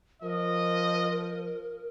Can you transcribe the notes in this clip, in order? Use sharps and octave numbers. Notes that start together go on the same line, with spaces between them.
F3 A#4 D#5